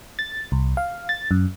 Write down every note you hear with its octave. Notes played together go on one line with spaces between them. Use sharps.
A6
C2
F5
A6
F#2